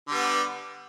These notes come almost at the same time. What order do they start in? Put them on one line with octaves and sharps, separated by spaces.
D3 G3 B3